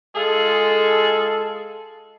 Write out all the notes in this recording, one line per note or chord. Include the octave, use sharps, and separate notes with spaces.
G#3 F4 G#4 A4